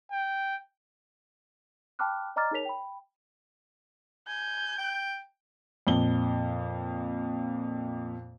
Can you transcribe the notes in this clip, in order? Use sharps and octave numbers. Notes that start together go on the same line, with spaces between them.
G5
G5 A5 B5 D6 F6 F#6
D5 D#5 A#5 D6 F6 A6
D#4 G#4 A#4 C#5 B6 F7
G5 B5
G#5 G6
G5
F2 A#2 G7